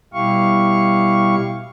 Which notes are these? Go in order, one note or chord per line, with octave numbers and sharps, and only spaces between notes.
B2 G3 E4 G4 F5 C#6